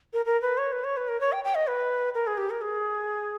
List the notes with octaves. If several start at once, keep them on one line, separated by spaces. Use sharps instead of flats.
A#4
A#4
B4
C#5
B4
C#5
B4
A#4
C#5
G5
G5
D#5
B4
A#4
G#4
G4
A#4
G#4